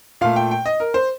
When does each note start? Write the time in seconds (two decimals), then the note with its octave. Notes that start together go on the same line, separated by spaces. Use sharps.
0.21 A#2 A3 F5
0.36 G5
0.51 G5
0.66 D#5
0.80 A#4
0.94 C5